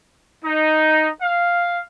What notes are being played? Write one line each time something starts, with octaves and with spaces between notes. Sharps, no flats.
D#4
F5